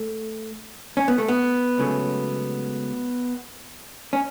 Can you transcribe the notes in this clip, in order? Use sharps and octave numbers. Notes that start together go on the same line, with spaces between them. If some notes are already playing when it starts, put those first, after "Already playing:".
Already playing: A3
C#4
B3
A3
B3
C#2 C#3 F#3 A3
C#4